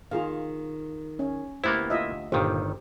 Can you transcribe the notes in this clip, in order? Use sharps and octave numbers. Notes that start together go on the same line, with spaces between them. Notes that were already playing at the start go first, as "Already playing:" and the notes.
D#3 F4 G#4 F5
C#4
D2 A#3 B3 E4 G4 C5
F4 D#5 E5
G1 A#2 D#3 G4 C5 F5